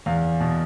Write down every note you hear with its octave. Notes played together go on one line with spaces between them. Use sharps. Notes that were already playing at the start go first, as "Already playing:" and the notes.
E2 F5
B2